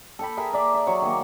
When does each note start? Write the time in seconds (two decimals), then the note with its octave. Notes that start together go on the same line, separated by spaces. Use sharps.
0.19 A4 G5 B5
0.37 G#4 A#4 E5
0.53 A#4 D5 E5
0.74 E5
0.87 F#3 C#5
1.02 D#3 A#3